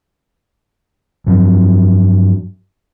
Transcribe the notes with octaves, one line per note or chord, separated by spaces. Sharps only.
G2 F3 F#3